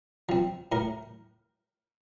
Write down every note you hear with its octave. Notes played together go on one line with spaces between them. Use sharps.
F3 C4
A2 A#4